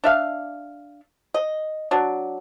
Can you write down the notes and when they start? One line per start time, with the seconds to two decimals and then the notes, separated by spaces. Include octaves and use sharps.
0.04 D4 E5 F5
1.34 D#5
1.91 F#3 D4